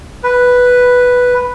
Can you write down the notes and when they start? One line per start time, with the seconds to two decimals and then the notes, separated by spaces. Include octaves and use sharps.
0.23 B4